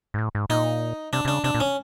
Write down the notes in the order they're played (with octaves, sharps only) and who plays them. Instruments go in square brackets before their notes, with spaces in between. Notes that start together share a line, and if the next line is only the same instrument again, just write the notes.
[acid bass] G#2
A2
G#2
[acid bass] A#2 [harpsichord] D#4
[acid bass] C3 [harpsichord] D4
[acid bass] C3
[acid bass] C#3 [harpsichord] D4
[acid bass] C3 [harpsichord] D4
[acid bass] A#2
[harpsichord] C#4